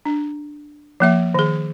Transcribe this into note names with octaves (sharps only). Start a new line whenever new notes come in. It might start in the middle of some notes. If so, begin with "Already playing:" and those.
D4
F3 A#3 E5
D#3 G#4